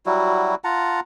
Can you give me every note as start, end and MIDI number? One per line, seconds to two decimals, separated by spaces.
0.06 0.55 54
0.06 0.55 55
0.06 0.55 64
0.06 0.55 66
0.64 1.00 65
0.64 1.00 78
0.64 1.00 81
0.64 1.00 82